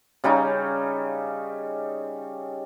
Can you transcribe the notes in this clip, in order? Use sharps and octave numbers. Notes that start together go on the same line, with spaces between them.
C#3 G3 C#4 D#4